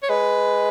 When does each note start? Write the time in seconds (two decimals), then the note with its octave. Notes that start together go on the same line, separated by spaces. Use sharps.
0.03 C#5
0.09 G#3 B4